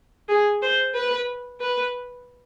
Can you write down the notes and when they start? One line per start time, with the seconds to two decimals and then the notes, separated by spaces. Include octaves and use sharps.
0.29 G#4
0.62 C5
0.94 B4
1.61 B4